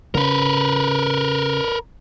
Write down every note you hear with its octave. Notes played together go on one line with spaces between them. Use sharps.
C#3 A#4 B4